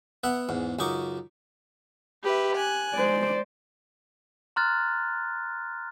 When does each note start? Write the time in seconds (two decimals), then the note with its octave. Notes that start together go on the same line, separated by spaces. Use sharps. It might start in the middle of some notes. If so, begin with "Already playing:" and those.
0.24 B3 E5 F#5
0.49 E2 G#2
0.79 C#2 F#2 D#4 C#6 D6
2.24 G4 B4 E5
2.56 G#5 F#6
2.94 G#3 C5 D5
4.56 A#5 C6 F6 F#6 A6